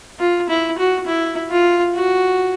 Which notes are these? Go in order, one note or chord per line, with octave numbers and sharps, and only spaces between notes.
F4
E4
F#4
E4
F4
F#4